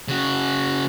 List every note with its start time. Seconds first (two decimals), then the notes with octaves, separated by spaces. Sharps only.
0.08 C#3 F#4